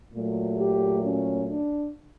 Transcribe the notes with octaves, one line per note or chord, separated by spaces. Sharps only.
A#2 F#3 A3
G4
C#4
D4